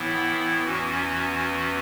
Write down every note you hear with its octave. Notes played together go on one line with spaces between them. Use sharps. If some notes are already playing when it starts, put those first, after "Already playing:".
Already playing: A2 E3 B3 E4
E2 E3 C#4 F#4